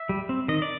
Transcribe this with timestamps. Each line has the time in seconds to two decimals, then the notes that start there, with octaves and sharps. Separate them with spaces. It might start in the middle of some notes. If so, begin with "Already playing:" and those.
Already playing: E5
0.09 G3
0.29 C4
0.48 D#3 D#5
0.62 D5